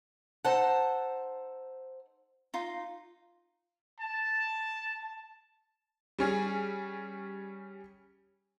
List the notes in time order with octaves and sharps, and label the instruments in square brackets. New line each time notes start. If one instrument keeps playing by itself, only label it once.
[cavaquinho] D#4 A4 F#5 [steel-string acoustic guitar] C5 A5
[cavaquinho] D#4 F4
[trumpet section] A5
[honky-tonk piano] G3 C#4 G#4